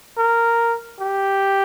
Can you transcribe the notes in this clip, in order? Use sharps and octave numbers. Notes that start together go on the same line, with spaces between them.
A#4
G4